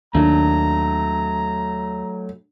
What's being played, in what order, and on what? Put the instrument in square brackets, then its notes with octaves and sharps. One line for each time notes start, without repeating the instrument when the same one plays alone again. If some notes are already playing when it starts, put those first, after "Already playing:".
[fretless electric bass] D#2 D#3 A#3 [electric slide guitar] F#3 A3 [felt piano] D4 [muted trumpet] A#5